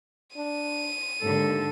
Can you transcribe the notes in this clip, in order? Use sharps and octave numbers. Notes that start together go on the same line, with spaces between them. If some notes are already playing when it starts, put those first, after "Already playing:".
D4 D#7
D#2 G#2 D3 A4